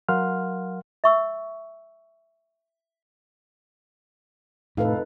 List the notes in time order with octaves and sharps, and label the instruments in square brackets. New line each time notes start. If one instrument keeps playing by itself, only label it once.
[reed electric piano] F#3 A#4 F5 F#5 C6 F6
[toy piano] E5 C#6 E6
[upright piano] F1 F5 [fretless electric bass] A2 [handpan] D#4 A4 B4